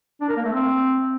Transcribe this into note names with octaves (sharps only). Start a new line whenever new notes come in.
D4
A#4
A#3
A3
C4